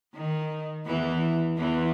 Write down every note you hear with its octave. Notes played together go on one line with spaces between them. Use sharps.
D#3
E2 E3
E2 E3